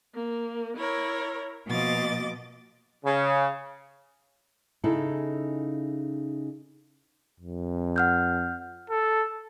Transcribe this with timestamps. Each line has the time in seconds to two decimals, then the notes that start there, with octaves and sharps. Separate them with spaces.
0.15 A#3
0.77 E4 A#4 C#5
1.67 B2 F3 A#3 D#5 D6 A6
3.04 C#3
4.84 C#3 D#4 E4 G#4 A4
7.40 F2
7.96 F#5 F6 G6
8.90 A4